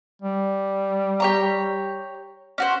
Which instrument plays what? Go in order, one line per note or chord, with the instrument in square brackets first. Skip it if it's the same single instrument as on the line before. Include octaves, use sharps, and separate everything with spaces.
[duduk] G3
[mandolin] G4 C#5 A#5
C#4 F#4 C5